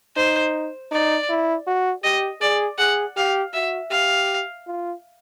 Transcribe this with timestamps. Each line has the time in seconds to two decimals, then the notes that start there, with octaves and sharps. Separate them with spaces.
0.16 D#4 C5
0.91 D#4 D5
1.29 E4
1.67 F#4
2.04 G4 D#5
2.41 G#4 D5
2.78 G#4 F#5
3.17 G4 F5
3.53 F#4 E5
3.91 G4 F5
4.67 F4